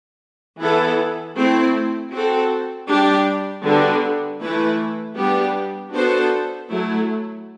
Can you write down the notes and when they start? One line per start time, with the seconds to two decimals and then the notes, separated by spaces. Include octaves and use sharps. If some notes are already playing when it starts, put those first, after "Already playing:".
0.61 E3 B3 E4 A4
1.37 A3 C4 E4
2.13 C4 F#4 A4
2.89 G3 D4 G4 D5
3.64 D3 G3 B3 D4 F#4
4.41 E3 A3 E4 B4
5.17 G3 B3 D4 G4
5.93 B3 D4 F#4 A4 C5
6.69 F#3 A3 E4